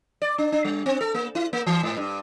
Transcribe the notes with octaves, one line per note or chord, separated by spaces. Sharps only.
D5
D4
D4
G3
C4
A4
A#3
E4
A#3
E3
G#2
G2